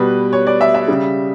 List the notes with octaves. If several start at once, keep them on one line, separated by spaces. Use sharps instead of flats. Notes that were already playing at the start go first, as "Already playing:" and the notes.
Already playing: B2 G3 B4
C#5
D5
E5
E5
C#3 G3